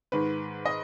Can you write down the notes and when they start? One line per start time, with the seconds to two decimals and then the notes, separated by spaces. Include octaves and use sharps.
0.12 G#2 D#3 B4
0.65 D#5